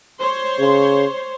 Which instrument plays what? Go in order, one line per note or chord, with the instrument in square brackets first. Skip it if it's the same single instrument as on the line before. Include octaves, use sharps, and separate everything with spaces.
[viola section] C5 C#5 C6
[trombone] C#3